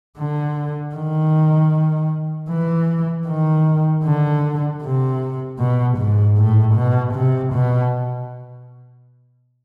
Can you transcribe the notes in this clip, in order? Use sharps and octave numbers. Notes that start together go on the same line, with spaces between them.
D3
D#3
E3
D#3
D3
C3
B2
G#2
A2
B2
C3
B2